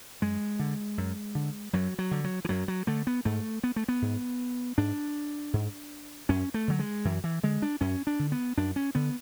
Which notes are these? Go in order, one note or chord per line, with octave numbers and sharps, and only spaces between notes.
F#2 G#3
D3
F#2
D3
F#2 F#3
F#3
D3
F#3
E3
F#2 F#3
F#3
D3 A3
B3
G#2 A3
B3
A3
B3
G#2
G#2 D4
G#2
F#2 C#4
A3
D3 F#3
G#3
F#2 E3
E3
D3 G#3
D4
F#2 C#4
D4
D3
B3
F#2 D4
C#4
D3 B3